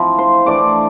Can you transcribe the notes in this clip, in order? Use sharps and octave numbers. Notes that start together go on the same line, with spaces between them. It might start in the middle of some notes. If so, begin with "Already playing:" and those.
Already playing: F3 C4 E4
C5 C6
E3 A3 D4 F4 D5 D6